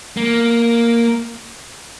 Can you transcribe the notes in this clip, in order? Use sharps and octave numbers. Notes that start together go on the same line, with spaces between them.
A#3